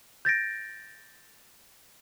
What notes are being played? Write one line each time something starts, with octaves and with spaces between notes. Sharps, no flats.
G6 A6 A#6 D7